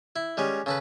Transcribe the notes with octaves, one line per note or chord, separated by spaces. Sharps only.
E4
G3 G#3 C#4
C#3 A4 B4